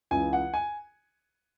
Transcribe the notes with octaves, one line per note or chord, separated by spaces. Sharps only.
C#2 C#3 E3 G#5
F#5
G#5